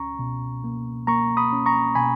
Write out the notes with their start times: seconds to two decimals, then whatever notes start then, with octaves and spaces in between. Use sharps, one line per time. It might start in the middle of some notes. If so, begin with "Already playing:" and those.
Already playing: C#2 C#4 A#5 C#6
0.19 B2
0.64 A#3
1.07 A#3 A#5 C#6
1.37 B5 D#6
1.52 C#4
1.66 A#5 C#6
1.95 B2 G#5 B5